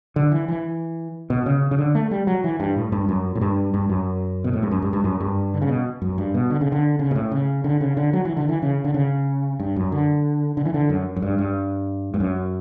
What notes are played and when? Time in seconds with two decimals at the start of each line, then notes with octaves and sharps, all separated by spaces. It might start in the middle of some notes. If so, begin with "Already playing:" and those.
0.16 D3
0.32 E3
0.48 E3
1.30 B2
1.46 C#3
1.71 C#3
1.79 D3
1.95 A3
2.11 G3
2.27 F#3
2.44 E3
2.60 G2
2.76 A2
2.92 G2
3.09 F#2
3.35 A2
3.41 G2
3.74 G2
3.89 F#2
4.44 B2
4.53 A2
4.63 G2
4.71 F#2
4.82 G2
4.93 G2
5.04 F#2
5.20 G2
5.54 D3
5.62 C#3
5.69 B2
6.02 F#2
6.18 G2
6.34 B2
6.50 D3
6.61 C#3
6.72 D3
6.99 C#3
7.11 B2
7.15 A2
7.32 C#3
7.64 D3
7.81 C#3
7.97 D3
8.13 F#3
8.25 E3
8.37 D3
8.49 E3
8.62 C#3
8.84 D3
8.94 C#3
9.60 G2
9.76 F#2
9.92 D3
10.57 D3
10.65 E3
10.74 D3
10.90 F#2
11.16 F#2
11.22 G2
11.38 G2
12.14 G2
12.20 F#2